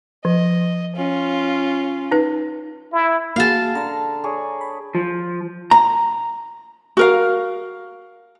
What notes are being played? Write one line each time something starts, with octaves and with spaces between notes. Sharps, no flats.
F3 D#5
C#4 F4
D#4 B4
E4
A#3 F#4 G#4 F5 A5
D3 A#5
G#4 C#5 D5
B5
F3
A#5
F#4 A#4 F5